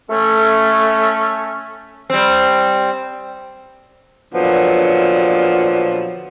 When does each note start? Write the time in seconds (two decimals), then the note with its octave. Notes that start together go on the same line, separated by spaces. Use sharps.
0.10 A3 C#4
2.10 G3 C4
4.34 A#2 D3 F3 F#3 B3